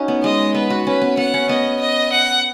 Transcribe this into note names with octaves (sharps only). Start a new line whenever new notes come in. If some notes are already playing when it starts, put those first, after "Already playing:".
Already playing: C#4 D#4 F#4
B3
G#3 D#5
B3 B4
F#4
C#4 B4
B3
B3 F#5
C#4
B3 D#5
D#5
F#5